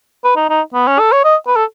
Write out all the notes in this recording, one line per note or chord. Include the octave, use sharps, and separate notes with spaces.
B4
D#4
D#4
B3
C#4
A4
C#5
D#5
B4
A4